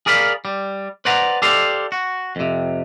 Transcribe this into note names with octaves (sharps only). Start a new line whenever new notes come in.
G#4 A#4 D5 F5 B5
G3
B4 C5 D5 F#5 A#5
G4 A4 C5 D5 F5
F#4
F2 C3